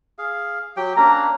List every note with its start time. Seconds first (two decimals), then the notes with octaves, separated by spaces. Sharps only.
0.18 G#4 F5
0.77 F#3 G4 G5
0.97 A#3 C#4 D4 A#5